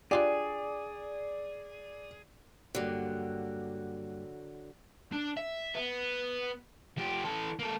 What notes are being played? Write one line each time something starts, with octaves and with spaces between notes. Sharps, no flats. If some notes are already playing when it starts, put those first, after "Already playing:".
D4 F4 G4 G#4 D5
G2 D3 F#3 A#3 G4
D4
E5
B3
F3 G4
E3 A4
A#3 A4